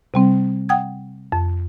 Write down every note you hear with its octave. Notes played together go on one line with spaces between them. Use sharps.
C3 G3 C4
F#5 G5 D#6 G#6
F2